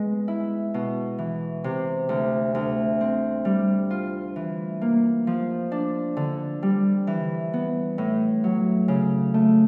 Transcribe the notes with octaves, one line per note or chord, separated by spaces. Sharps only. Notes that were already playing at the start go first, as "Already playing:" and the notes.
Already playing: G#3 B3
E4
B2
E3
C3
D2
D2
C4
G3
F4
E3
A#3
F3
D4
D3
G3
E3
B3
A2
F#3
C#3
A3